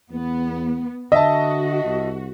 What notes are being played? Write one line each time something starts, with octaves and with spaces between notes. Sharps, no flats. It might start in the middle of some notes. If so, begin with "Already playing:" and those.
E2 B3
D3 F#4 D#5 E5 A5
C2